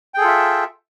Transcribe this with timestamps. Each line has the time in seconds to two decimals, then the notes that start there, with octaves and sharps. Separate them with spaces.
0.14 G5
0.18 G#4
0.21 A4
0.24 F4
0.28 E5